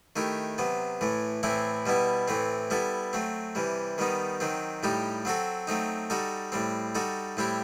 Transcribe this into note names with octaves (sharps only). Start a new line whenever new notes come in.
D#3 A3 E4 G4
C3 F#3 B3
A2 E3 A3
A2 E3 A3 C4 E4
B2 G3 B3 E4
A2 E3 A3 C4
G3 B3 E4 A4
F#3 A3 C4
C3 E3 G3
D#3 G3 B3 D#4
D#3 F#3 C4
A2 G3 D#4 G4
F#3 C4 F#4 A4
F#3 A3 C4 D#4
G3 D#4 F#4 A4
A2 G3 C4
G3 D#4 F#4 A4
A2 G3 C4 E4 G4